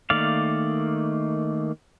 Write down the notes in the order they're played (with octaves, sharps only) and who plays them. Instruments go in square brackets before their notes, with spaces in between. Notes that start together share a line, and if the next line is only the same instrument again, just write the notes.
[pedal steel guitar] D#3 A3 A#3 D5 F5